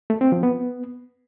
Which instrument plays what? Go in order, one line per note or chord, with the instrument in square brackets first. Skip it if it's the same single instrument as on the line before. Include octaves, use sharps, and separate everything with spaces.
[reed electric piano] A3
C4
F3
B3